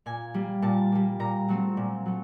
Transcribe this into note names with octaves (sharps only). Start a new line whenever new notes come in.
A#2 G#5
G3 A#3
A#2 A5
G3 A#3
A#2 A#5
F#3 A3 C4
A#2
F#3 A3